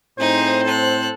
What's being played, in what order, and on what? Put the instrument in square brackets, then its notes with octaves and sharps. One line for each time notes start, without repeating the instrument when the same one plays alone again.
[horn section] A2 C4 C5 [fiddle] D#4 G#4
[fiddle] A4 F#6